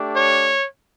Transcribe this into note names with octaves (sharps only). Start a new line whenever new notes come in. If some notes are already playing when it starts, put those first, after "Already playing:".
Already playing: A3 D4 G4
C#5